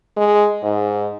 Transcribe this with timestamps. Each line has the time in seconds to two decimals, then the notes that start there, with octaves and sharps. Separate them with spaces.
0.17 G#3
0.63 G#2